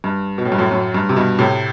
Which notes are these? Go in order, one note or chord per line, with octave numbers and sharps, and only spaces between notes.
G2
B2
A2
G2
F#2 A2
F#2 A2
G2
C3
G2 B2
A2 C3